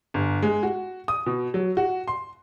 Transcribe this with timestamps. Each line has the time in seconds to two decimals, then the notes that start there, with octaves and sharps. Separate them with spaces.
0.14 G1
0.42 G#3
0.63 F#4
1.08 D#6
1.26 B2
1.54 F#3
1.77 F#4
2.08 C6